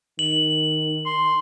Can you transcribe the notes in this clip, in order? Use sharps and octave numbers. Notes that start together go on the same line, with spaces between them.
D#3 F#7
C6